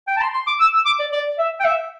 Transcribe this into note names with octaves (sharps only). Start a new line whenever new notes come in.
G5
A5
C6
C6
D6
E6
E6
D6
D5
D5
E5
G5
E5